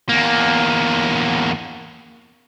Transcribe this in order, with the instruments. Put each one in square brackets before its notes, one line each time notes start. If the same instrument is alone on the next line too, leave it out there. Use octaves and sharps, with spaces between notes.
[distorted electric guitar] E2 A#3